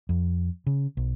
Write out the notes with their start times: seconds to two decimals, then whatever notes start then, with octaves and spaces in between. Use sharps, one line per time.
0.09 F2
0.67 C#3
0.97 B1